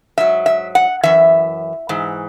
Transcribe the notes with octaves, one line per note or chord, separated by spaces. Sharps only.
G#2 F#3 E5
E5
F#5
F#2 E3 E5
G#2 E3